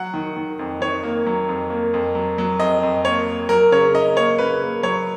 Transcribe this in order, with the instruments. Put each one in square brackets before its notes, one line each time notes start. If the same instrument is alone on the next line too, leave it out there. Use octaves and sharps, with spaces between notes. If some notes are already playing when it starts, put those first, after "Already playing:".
Already playing: [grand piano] F#3 F#5
D#3
D#3
F2
D#3 C#5
A#3
F#3
F2
A#3
F2
F#3
F#3
F2 D#5
F2
A#3 C#5
A#3
F#3 A#4
C#3 C#5
C#3 D#5
A#3 C#5
C#3 B4
A#3
F#3 C#5